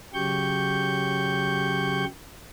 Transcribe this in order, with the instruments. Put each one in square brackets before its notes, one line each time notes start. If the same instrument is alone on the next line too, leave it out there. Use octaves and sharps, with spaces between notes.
[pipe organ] C#3 F#3 G4 C#6 G6